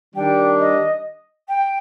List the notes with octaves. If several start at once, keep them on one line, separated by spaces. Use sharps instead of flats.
D#3 G3 D4 G5
D#5
G5